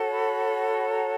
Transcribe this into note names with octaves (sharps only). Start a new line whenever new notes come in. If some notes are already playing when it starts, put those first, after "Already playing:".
Already playing: F#4 A4 C#5
B5
B5
A#5